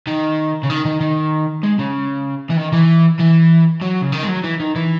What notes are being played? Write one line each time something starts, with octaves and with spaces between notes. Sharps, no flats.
D#3
C#3
D#3
D#3
D#3
G#3
C#3
E3
D#3
E3
E3
F#3
C#3
D#3
G#3
F#3
E3
D#3
E3